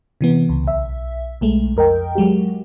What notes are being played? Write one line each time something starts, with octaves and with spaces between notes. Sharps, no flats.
C3 E3 B3
C#2
B1 E5
B1 G#3 A3
F2 A#4 D#5 G5
F#3 G#3 F#4 G4